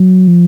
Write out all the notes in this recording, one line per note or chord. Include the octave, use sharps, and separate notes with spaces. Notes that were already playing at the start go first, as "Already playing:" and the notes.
Already playing: F#3
F3